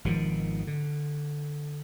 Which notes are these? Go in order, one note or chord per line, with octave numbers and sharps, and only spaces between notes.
G#1 B2 D#3 F3
D3